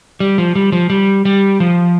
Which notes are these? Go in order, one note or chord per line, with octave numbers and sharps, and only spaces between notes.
G3
F3
G3
F3
G3
G3
F3